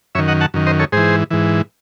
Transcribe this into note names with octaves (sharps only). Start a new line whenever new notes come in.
F#2 D#3 C#5 E5
D#5 F#5
F#5 A5
F#2 D#3
C5 D#5
A4 C#5
G#2 E3 G#4 C5
G#2 E3